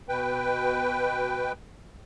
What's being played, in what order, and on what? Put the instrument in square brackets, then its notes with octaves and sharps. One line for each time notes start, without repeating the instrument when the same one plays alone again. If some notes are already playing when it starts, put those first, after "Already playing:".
[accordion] B2 B4 G5